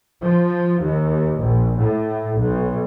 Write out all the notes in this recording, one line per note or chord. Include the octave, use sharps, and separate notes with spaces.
F3
D#2
A#1
A2
B1